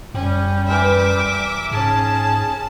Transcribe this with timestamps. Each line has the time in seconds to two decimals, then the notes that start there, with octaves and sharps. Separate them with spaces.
0.14 F#2 G3 C#4 G4
0.68 E3 A#4 E5 C6 D6
1.71 G#2 C#4 G#4 A5